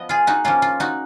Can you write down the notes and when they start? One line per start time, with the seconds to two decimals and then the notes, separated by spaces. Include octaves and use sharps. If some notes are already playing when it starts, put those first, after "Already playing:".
Already playing: F3 B3 D#5
0.09 F4 G#4
0.27 D#4 F#4
0.45 F3 A#3 C#4 F4
0.62 F4
0.80 D#4 F#4